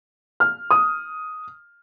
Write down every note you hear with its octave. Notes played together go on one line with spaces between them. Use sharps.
F6
D#6